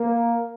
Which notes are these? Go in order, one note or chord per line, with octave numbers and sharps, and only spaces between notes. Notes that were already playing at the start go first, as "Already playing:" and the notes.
Already playing: A#3